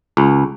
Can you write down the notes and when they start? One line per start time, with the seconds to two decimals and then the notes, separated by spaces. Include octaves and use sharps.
0.17 C#2